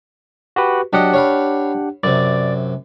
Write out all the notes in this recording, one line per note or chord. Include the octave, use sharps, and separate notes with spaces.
F#4 G4 B4
F#3 D4 G4 D#5 F#5
C#5 F5 B5
F#2 C3 D5